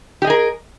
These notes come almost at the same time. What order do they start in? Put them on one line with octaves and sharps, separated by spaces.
G4 D#5 G#4 A#4